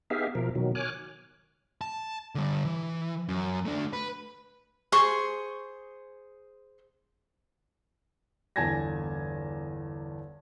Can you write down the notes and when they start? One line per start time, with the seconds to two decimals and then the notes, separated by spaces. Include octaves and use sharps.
0.10 B3 D#4 G4 G#4 E5 F5
0.35 B2 F3 A#4
0.55 B2 D#3 F#3
0.75 C#5 G#5 D6 F6 F#6
1.81 A5
2.35 D3 G3
2.65 E3
3.29 F#2
3.65 A3 D4
3.93 B4
4.92 G#4 C5 C6 C#6
8.56 G1 E2 G#5 A5 G#6 A#6